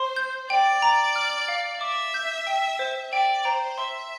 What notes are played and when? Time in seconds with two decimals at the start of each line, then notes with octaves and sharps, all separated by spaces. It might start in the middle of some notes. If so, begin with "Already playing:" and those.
Already playing: C5 C6
0.16 G6
0.49 D5 G5
0.82 A#5
1.16 F6
1.48 F5
1.81 E5 D6
2.14 G6
2.47 G5
2.79 C5
3.13 D5 G5
3.45 C5 A#5
3.78 E5 C6